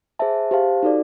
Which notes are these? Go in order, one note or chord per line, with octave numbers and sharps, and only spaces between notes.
G#4 C5 E5 A5
G4 C5 F5 A5
D#4 F#4 A4 D5